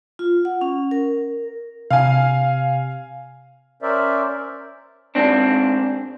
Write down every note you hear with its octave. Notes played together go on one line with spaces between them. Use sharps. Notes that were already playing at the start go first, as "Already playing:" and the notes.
F4
F#5
C#4
A#4
C3 F5 G#5
C#4 A#4 C5 D5 E5
G#2 C4 D4